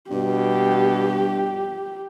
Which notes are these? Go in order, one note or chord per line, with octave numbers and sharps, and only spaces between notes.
G2 B2 G4